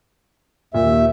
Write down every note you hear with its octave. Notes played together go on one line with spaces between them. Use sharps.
D#2 A#2 E5